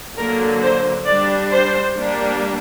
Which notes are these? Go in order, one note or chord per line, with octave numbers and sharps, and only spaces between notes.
D3 F#3 A#3 A#4
C5
G3 D4 D5
C5
G3 A#3 D4